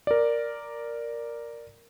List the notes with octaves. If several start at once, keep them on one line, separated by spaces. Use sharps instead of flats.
A#4 D5